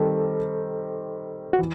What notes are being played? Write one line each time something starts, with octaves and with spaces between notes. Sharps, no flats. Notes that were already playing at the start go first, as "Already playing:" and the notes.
Already playing: D#3 G3 C4 A4
F#4
E3